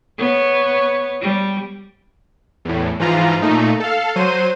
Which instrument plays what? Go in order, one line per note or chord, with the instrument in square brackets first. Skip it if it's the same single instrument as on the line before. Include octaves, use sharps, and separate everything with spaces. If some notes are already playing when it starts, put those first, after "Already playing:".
[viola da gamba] B3 C#5
G3
[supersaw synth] E2 A2
G#2 E3 F3 F4 A#5
A#2 A3 D#4
A4 F5
F#3 C5 D#7